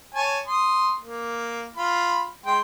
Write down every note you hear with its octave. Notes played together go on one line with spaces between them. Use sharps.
C#5 G#5 A5
C6 D#6
A#3
F4 B5
G#3 G5 C6